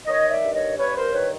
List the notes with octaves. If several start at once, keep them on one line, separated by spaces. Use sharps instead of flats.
D#3 C#5 D#5
D5 E5
G2
C#5 D#5
G2 B4 C#5
A#4 C5
D#3 B4 C#5